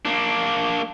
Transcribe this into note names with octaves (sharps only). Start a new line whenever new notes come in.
A#3 D4